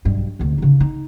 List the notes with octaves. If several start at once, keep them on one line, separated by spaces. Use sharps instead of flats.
B1 G2
D2 C3
C#3 D#4
D#4